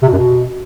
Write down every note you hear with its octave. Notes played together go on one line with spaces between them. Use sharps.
C3
B2
F#2
B2